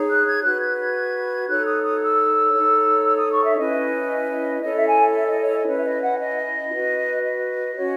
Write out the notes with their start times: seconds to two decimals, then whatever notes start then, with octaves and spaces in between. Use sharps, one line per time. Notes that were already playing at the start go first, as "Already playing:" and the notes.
Already playing: D#4 G#4 C#5
0.09 F#6
0.26 G#6
0.43 F#4 B4 F#6
0.61 G#6
0.79 G#6
1.49 D#4 A4 C#5 F#6
1.66 D#6
1.84 D#6
2.01 E6
2.53 D#4 A4 C#5
3.06 E6
3.18 D#6
3.32 C#6
3.44 E5
3.57 C#4 E4 B4 D#5
4.62 E4 A4 C#5 D#5
4.75 E5
4.89 G#5
5.15 E5
5.27 D#5
5.41 C#5
5.54 D#5
5.67 C#4 E4 B4 C#5
5.77 E5
5.84 D#5
6.02 F#5
6.19 D#5
6.71 F#4 B4
7.24 D#5
7.76 C#4 F#4 C#5